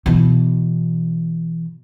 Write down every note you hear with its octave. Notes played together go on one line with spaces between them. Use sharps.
B2 E3